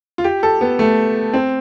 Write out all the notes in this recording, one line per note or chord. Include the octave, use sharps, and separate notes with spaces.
F4
G4
A4
B3
A3
C4